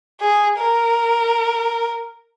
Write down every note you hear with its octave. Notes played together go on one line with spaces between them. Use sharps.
G#4
A#4